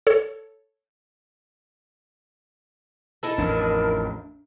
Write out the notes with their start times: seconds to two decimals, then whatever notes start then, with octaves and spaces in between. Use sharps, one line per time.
0.07 A4 C#5
3.23 D#4 E4 A4
3.38 A1 F2 D4 A#4